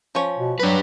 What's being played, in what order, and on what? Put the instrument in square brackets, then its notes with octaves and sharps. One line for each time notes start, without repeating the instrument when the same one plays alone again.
[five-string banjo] F3 C#4 C#5
[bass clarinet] B2
[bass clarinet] F#3 [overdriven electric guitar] D4 B4